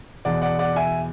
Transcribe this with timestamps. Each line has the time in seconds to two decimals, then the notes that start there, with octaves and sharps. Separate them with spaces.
0.25 E2 B2 D5 F#5
0.42 D5 F#5
0.59 D5 F#5
0.76 E5 G#5